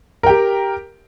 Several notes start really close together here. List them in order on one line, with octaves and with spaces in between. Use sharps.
A#4 G5 G4